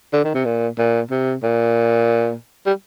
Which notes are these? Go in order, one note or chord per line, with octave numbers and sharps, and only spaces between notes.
D3
D#3
C3
A#2
A#2
C3
A#2
G3